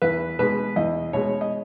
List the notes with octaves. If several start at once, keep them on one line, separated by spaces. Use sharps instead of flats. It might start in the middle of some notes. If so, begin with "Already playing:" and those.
E2 B4
B2 G#3 B4
E2 D#5
B2 G#3 C#5
D#5